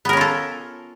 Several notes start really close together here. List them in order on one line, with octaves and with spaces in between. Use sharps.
B3 A#4 C#4 F4 A4